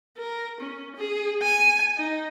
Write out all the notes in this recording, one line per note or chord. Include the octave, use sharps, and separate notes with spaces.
A#4
C#4
G#4
G#5
D#4